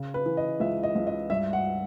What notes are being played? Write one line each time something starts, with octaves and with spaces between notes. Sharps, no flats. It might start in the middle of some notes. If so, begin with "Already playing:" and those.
Already playing: C#3
B4
E3
D#5
C#2 E5
D#5
C#2
D#5
G2 E5
F#5